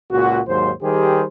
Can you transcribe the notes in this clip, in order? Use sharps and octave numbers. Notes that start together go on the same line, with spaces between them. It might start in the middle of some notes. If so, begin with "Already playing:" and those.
C#2 A#2 F#4
D#2 G#2 F#3 C5
D#3 G3 G4 G#4 C5